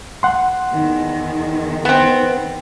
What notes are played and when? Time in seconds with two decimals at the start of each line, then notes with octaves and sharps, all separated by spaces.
0.23 F#5 C6
0.73 E2 D#3
1.85 B3 C4